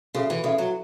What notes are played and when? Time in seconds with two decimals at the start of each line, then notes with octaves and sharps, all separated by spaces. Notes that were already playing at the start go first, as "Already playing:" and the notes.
0.14 C#3 F#4 A4 E5
0.30 E3
0.44 C#3 F#4 A4 E5
0.58 F#3